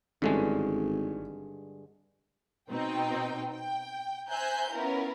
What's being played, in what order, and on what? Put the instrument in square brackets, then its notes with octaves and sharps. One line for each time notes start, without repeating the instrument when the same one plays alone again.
[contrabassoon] G#1 [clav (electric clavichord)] G2 D3 G#3 [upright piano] E3 A3 C#4
[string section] B2 C4 D#4 G5
G5
C5 E5 G#5 A#5 F#6 G6
B3 C#4 E4 F4 A#4